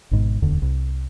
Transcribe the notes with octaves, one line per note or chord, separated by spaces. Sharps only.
G#1 G#2 B2
D1 E2 D3
C2